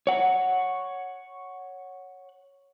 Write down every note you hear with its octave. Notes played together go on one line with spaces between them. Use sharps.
C#5 F#5